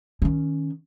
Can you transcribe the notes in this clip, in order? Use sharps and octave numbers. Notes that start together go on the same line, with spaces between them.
D#3 C#4